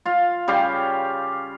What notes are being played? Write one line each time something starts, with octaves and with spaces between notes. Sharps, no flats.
F4 F5
C#3 G3 G4 F5